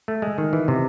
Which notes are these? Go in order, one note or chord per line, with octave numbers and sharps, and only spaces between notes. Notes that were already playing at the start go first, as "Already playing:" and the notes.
A3
G#3
D#3
E3
C3